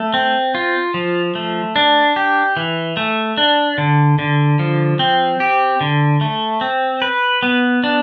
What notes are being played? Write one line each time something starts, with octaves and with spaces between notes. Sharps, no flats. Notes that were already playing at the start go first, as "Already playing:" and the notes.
Already playing: A3
C4
F4
F3
A3
D4
G4
E3
A3
D4
D3
D3
F3
C4
G4
D3
A3
C4
B4
B3
D4